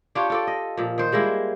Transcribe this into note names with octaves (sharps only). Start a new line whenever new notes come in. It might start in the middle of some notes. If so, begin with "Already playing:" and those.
D4 F4 G4 C#5
F4 A4 D5
D#5
A#2 F3
D#3 C5
G3 G#3 A#3 E4